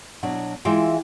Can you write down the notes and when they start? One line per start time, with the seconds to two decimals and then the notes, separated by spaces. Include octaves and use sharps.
0.23 B2 F#3 D4
0.65 E3 G#3 F4 E5 G5